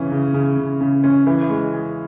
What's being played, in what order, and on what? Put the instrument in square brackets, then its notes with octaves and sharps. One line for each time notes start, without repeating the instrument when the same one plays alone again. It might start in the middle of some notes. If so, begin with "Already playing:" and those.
Already playing: [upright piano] C#3 E3 C#4
C#3
C#3
C#3
C#3
C#4
E3
G#3
G#4